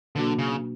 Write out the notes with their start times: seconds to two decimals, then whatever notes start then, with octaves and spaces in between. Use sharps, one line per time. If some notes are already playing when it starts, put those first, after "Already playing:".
0.15 B2 D3 F#3 A#3 D4 F#4
0.39 C#3